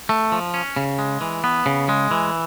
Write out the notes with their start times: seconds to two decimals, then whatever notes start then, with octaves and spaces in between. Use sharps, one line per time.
0.09 A3
0.32 F3
0.54 C#4
0.76 C#3
0.99 G#3
1.21 E3
1.44 B3
1.66 C#3
1.89 G#3
2.11 E3